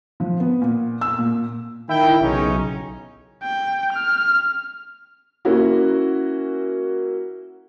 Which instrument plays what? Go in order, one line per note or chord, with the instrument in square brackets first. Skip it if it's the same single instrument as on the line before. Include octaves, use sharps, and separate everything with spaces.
[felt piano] F3
B3
A#2
E6
A#2
[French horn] D#3 [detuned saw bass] E4 [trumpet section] G5
[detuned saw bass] B1 [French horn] C#3 [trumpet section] C#4 D#4
[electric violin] G5
F6
[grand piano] A#3 C#4 E4 F#4